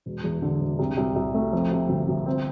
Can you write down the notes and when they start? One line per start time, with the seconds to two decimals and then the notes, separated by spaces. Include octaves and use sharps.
0.06 E1
0.24 E2
0.42 D3
0.61 E1
0.79 C2
0.97 C2
1.16 C2
1.34 A3
1.53 F2
1.71 C3
1.89 G1
2.08 G1
2.26 C4